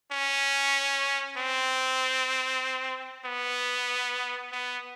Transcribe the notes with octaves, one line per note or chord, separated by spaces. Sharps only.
C#4
C4
B3
B3